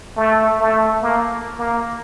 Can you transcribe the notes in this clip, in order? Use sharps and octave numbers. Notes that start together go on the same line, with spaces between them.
A3
A3
A#3
A#3